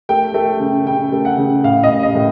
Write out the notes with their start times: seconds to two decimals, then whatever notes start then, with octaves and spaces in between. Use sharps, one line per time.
0.09 A3 G5
0.34 A3
0.60 C#3
0.86 C#3 G5
1.12 A3
1.25 F#5
1.37 C#3
1.64 A2 F5
1.84 D#5
1.89 A2
2.03 D#5
2.15 A2